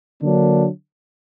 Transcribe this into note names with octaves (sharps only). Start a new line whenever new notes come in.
D3 F#3 A#3 D4